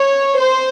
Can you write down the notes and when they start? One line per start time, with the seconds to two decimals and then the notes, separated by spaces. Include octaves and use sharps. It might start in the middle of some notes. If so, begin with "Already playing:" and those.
Already playing: C#5
0.37 C5